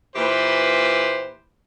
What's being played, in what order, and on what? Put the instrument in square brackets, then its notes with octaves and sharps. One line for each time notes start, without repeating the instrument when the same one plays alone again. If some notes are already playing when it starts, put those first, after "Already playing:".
[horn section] A#2 E3 G4 B4 C5